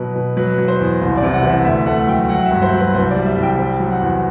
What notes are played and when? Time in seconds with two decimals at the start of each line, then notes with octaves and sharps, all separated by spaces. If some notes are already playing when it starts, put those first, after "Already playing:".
Already playing: B2 F#3 B4
0.15 B2
0.37 F#3 B4
0.58 F#3
0.68 C5
0.80 E2
1.01 C2
1.17 D5
1.23 C3
1.33 F#5
1.43 E3
1.50 E5
1.65 D2 E5
1.86 A3 F#5
2.08 F#3 G5
2.29 F#3 F#5
2.45 E5
2.51 G2
2.62 C5
2.73 F#3 B4
2.94 C2 C5
3.11 D5
3.16 G3
3.26 E5
3.36 C2
3.43 G5
3.58 C4
3.80 F#3
3.91 F#5
4.01 E2